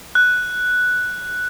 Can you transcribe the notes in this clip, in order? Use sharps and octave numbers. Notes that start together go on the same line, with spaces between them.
F#6